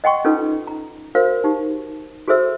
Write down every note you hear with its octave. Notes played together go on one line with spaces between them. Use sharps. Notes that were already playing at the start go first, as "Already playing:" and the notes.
D#5 F#5 G5 C6 C#6
C#4 D#4 F4 A4 B4
A#5
F#4 A#4 C5 F5
D#4 G4
F#4 G#4 A4 C5 E5 E6